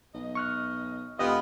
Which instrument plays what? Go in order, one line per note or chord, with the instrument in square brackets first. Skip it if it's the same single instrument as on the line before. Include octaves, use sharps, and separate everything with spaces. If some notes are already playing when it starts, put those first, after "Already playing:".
[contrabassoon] B1 [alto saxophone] D#5
[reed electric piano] C#6 F6 F#6
[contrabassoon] E1 [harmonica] B3 F4 [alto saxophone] G4 [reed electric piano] D#5